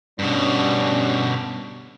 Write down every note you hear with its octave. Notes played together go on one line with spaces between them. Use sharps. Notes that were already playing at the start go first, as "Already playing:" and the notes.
G2 B2 G3 C#4 D4